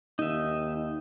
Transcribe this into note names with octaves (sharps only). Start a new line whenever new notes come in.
D#2 D#4 E5